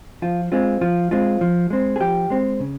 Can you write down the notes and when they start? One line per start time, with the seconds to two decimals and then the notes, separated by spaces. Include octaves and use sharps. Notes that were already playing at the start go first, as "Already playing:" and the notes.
0.22 F3 F4
0.52 G#3 C4 F4
0.81 F3 F4
1.11 G#3 C4 F4
1.41 F3
1.70 G#3 C4
1.96 G#4
2.00 F3 G4
2.30 G#3 C4
2.60 C#3